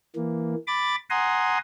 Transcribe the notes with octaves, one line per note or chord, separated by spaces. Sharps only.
E3 A#3
B5 D6 A6
F#5 G#5 A#5 C6 D#6